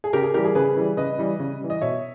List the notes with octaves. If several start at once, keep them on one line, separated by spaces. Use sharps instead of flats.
G#4
C#3 G4 A#4
G#4
E3 G3 G4 A#4
G#4
C#3 G#4 B4
E3 G3
C#3 B4 D#5
E3 G3
C#3
E3 G3
D#5
B2 C#5 E5